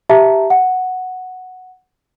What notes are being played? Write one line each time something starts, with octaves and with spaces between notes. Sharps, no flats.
G4 E5 A5 A#5
F#5